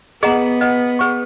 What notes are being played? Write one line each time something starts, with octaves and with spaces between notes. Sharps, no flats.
B3 G#4 D#5 F#5 A#5
B4 D#5 F#5
G#4 B4 F#5 C#6